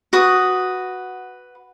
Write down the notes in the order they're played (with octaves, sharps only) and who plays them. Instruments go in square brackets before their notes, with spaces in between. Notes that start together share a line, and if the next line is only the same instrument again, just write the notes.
[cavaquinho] F#4 B4 D#6